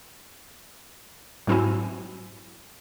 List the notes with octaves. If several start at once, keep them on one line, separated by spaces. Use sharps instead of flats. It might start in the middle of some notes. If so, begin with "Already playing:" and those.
G#2 F#3 C4 E4 F#4 G#5